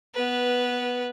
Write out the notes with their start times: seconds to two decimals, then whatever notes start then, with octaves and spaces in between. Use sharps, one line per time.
0.14 B3 B4